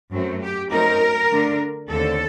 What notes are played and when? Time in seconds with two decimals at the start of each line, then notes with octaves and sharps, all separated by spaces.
0.11 F#2 F#3 A3 C4
0.41 G4
0.71 F#2 F#3 A3 C4 D#4 A#4
1.31 D3 A3 D4
1.90 D#2 D3 A3 C4 A4